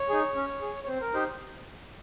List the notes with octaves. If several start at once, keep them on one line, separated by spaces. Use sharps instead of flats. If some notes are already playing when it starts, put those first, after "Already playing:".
Already playing: C#5
D#4 G#4
C#4
G#4
C#5
C4 C5
A#4
D#4 G4 C5